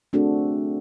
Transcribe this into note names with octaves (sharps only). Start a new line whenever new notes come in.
A3 C4 D4 F#4 G#4 A4